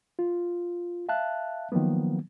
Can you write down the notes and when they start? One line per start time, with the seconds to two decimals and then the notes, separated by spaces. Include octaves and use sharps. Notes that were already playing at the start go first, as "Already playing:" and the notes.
0.19 F4
1.09 E5 F5 A5 F#6
1.72 D#3 F3 F#3 A#3 B3